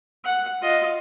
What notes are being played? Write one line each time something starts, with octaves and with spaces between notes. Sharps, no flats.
F#5
F4 D#5